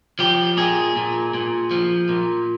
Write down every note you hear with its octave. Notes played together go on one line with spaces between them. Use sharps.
F3 G4
A#2 G#4
A#2
A#2
F3
A#2